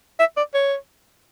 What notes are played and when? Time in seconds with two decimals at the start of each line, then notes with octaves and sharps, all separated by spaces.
0.19 E5
0.37 D5
0.54 C#5